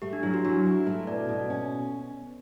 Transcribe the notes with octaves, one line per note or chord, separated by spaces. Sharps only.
A3 G4
D4
F#3 E4
F#4
F#3 D4
E4
A3 E4
B2 D5
B2
C#4